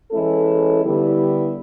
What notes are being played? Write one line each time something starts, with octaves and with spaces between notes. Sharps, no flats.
E3 G#3 C#4 E4 A4
D3 G3 B3 E4 G4